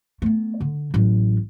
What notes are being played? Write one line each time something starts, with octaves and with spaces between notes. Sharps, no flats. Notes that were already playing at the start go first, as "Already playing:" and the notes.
A3 B3
D3
A1 F#3